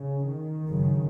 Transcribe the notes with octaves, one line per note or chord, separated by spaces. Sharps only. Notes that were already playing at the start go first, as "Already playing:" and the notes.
Already playing: C#3
D#3
F#1 F#2 C#3